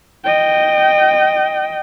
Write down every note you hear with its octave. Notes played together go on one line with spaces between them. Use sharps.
D#5 G5